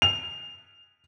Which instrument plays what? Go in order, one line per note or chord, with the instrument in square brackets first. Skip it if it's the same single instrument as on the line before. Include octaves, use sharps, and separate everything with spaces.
[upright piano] F7